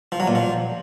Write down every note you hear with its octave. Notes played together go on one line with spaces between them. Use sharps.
F3
F#3
A#2
F3